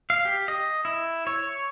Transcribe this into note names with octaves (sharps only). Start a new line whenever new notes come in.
F5
G4
D#5
E4
C#5